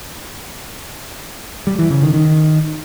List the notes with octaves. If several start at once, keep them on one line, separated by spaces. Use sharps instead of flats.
G3
E3
C#3
D#3
D#3